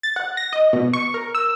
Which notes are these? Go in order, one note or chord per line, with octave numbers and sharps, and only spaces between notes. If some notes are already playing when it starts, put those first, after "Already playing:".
A6
F#5
A#6
D#5
B2
C#6
A#4
E6